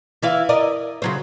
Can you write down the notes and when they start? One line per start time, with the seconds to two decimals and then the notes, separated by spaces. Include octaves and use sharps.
0.22 E3 E4 F5
0.49 A#4 D5 D#5
1.02 C#3 F#3 C5